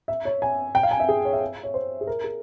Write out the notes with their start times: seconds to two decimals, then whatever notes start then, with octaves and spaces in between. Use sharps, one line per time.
0.08 E5
0.25 C#5
0.42 G#5
0.75 G5
0.83 F5
0.91 G#5
1.00 E5
1.09 G#4
1.25 C#5
1.33 E5
1.64 C#5
1.74 C5
2.01 G#4
2.07 A#4
2.24 G#4